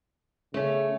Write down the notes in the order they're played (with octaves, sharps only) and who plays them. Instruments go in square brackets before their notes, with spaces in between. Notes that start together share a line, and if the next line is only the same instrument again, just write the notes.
[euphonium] C#3 [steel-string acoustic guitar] A3 C#4